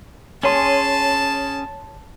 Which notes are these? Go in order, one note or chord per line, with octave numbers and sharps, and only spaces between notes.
C#4 G#4 C#5 A5 C6